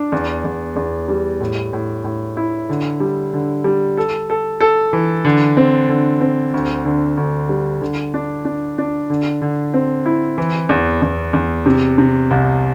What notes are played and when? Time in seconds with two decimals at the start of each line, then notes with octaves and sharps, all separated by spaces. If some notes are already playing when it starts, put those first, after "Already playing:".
Already playing: D4
0.12 E2
0.44 E2
0.76 E2
1.08 G3
1.40 A2
1.73 A2
2.04 A2
2.37 E4
2.69 D3
3.00 G3
3.33 D3
3.64 G3
3.97 A4
4.30 A4
4.61 A4
4.93 E3
5.25 D3
5.57 C4
5.89 D3
6.21 C4
6.54 D2
6.85 D3
7.17 D2
7.49 G3
7.81 D3
8.14 D4
8.45 D4
8.78 D4
9.10 D3
9.42 D3
9.74 C4
10.06 E4
10.38 E3
10.69 E2
11.02 E2
11.33 E2
11.66 C3
11.98 C3
12.31 C2